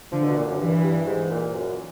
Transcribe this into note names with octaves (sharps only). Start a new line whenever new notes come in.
D3 F3
B2
A#2
F#2
G2 E3
G2
G#2
A#2
F#2